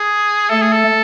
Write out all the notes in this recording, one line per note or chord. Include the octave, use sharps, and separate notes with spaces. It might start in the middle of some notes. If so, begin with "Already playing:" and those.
Already playing: G#4
A3 A4
G#4
A4